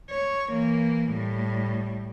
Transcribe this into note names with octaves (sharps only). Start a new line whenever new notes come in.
C#5
E3 A#3
A2 G3